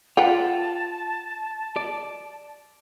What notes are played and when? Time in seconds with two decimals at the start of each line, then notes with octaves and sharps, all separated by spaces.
0.17 F4 B4 F#5 G5 A5
1.76 D5